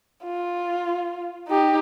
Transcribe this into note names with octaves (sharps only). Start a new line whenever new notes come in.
F4
D#4 G4